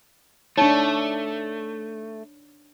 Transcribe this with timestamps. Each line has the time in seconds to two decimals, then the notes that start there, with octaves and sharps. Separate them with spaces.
0.58 A3 D4 D#4 C#5